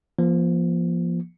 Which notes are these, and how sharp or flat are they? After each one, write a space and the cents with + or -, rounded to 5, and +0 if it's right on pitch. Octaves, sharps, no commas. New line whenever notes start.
F3 -20 A#3 +40